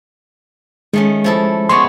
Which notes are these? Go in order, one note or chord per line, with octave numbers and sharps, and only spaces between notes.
D#3 G#3 A3 C#4
F3 E4 A4
G#3 B3 C6 C#6